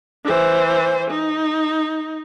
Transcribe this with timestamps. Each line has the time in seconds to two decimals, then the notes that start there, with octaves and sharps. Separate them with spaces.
0.25 E3 C5
1.10 D#4